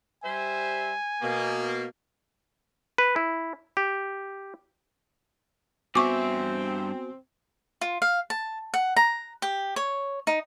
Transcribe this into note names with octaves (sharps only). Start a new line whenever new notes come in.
G3 C5 E5 G#5
B2 A#3
B4
E4
G4
G2 B3 C4 F#4 E5 G#5 C#6 D6
F4
F5
A5
F#5
A#5
G4
C#5
D#4